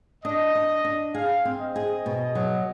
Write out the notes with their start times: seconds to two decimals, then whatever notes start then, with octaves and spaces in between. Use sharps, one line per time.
0.24 D4 D#5
0.55 D4
0.85 D4
1.14 G#4 F5
1.45 C4
1.60 D#5
1.76 G#4
2.06 B2
2.35 F#3